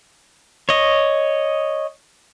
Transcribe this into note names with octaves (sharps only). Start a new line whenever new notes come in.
C#5 D#5